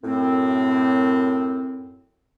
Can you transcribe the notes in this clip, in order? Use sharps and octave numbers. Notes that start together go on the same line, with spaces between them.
F#2 A2 C4